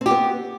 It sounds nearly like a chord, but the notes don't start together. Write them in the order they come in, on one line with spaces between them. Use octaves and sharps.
C4 G4 B3